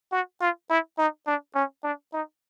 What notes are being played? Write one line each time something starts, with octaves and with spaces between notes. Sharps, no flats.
F#4
F4
E4
D#4
D4
C#4
D4
D#4